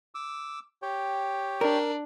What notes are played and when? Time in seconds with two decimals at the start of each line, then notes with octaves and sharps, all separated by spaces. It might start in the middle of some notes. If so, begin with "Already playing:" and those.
0.15 D6 E6
0.82 G4 C#5 G5
1.61 D4 A#4